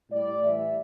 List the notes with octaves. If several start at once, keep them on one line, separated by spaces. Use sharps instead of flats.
A2 G3 D5
A2 E3 G3 E5